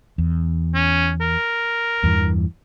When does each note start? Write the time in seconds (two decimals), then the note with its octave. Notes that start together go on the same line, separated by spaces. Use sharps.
0.18 E2
0.75 C#4
1.21 A#4
2.04 E2 G2 E3